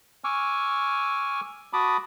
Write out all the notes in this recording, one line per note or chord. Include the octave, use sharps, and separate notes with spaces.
G#5 C#6 D6 E6 F6
F#4 A5 B5 D6 D#6